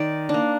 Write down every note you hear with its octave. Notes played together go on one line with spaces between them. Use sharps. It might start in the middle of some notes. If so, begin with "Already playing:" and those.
Already playing: D#3 D5
D4
A#3